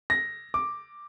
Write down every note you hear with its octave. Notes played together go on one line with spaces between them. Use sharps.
A#6
D6